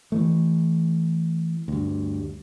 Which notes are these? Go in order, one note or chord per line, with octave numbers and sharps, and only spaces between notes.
E3 A3
D2 G2